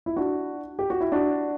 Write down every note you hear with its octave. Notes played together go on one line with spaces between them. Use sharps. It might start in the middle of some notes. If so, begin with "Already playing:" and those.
E4
D4 F#4
G4
F#4
E4
D4 F#4